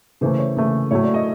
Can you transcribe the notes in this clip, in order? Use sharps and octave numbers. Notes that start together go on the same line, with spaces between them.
C#3 E3 A3 C5
C#5
C#3 E3 A3
A2 F#3 A3 C#5
D5
D#5